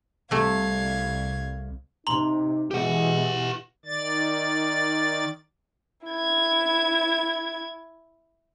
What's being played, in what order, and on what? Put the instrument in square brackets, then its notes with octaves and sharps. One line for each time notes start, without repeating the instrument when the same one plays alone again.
[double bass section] C2 [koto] C3 A3 [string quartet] F5 G#6
[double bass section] C3 [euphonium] D#4 [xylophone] A#5 C6 F#7
[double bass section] B2 E3 [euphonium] G#3 [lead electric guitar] G4 F#5
[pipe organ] D#3 D5 A6
[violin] E4 G#6